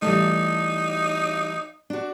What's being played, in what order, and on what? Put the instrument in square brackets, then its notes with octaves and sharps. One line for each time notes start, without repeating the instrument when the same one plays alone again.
[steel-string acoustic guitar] E3 G3 A3 [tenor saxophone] D#4
[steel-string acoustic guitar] D4 F#4